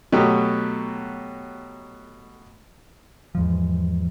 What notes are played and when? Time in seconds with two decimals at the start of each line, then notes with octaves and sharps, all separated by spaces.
0.12 B2 F#3 A3 G4
3.35 E2 G#2 F3